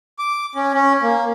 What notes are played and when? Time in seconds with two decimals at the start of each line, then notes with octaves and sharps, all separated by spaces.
0.19 D6
0.55 C#4
0.74 C#4
1.02 A#3